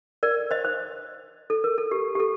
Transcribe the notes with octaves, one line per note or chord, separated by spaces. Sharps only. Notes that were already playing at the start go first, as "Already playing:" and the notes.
A#4 D5
C5 D#5
C5
A4
A#4
A4
G4
G4
A4